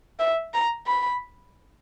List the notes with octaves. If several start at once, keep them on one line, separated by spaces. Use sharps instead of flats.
E5
A#5
B5